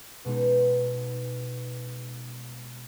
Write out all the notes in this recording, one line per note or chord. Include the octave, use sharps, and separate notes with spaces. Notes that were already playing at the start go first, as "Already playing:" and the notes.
B2 G#3 B3 D#4